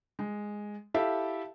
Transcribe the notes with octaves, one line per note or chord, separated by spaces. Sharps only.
G#3
E4 G4 A4 E5 F5